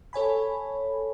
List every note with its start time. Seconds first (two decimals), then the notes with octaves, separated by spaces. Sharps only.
0.13 A4 C#5 G#5 B5